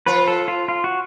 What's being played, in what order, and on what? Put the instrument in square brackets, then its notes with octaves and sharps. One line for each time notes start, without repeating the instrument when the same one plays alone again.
[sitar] F3 F4 [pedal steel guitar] B4
[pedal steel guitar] A4
F4
F4
F#4